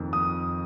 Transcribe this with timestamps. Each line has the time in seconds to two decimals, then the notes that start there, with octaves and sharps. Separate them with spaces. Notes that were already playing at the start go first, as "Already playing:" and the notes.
Already playing: F2 D#3 A#3
0.13 D#6